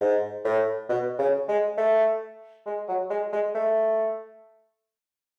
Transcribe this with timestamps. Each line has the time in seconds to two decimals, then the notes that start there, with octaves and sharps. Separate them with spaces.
0.01 G#2
0.44 A2
0.89 B2
1.19 C#3
1.48 G#3
1.77 A3
2.66 G#3
2.88 F#3
3.10 G#3
3.33 G#3
3.55 A3